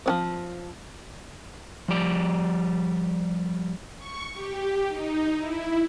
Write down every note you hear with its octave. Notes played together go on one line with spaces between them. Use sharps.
F3 F#3 C4
F3 G3 D5
C#6
G4
D#4
E4